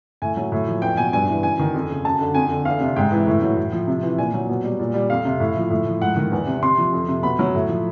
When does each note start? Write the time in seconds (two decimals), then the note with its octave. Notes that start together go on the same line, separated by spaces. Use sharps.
0.22 A2 G#5
0.37 F#3
0.52 A2
0.67 F3
0.82 E2 G5
0.97 B2 G#5
1.13 G2 G#5
1.28 E3
1.43 F#2 G#5
1.59 D#3
1.74 F2
1.90 C#3
2.05 F#2 A5
2.20 D3
2.34 F2 G#5
2.51 D3
2.65 E2 F5
2.80 C3
2.96 G#2 G5
3.12 E3
3.27 A2
3.42 F#3
3.57 A2
3.73 F3
3.87 C3
4.03 E3
4.18 A#2 G#5
4.34 F#3
4.49 B2
4.64 G3
4.79 A#2
4.94 G3
5.10 F2 F5
5.25 C3
5.40 A2
5.56 F3
5.70 A2
5.86 F3
6.01 G#2 F#5
6.16 D#3
6.32 E2
6.47 C3
6.62 C3 C6
6.78 F3
6.93 F2
7.08 C3
7.23 B2 B5
7.39 F#3
7.55 A2
7.69 F3